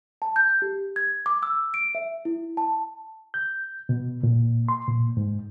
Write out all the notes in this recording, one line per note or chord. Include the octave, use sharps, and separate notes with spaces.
A5
G6
G4
G#6
D6
E6
D7
E5
E4
A5
G6
B2
A#2
C6
A#2
G#2